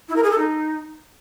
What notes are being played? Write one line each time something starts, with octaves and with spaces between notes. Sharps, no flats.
E4
A#4
G#4
A4
D#4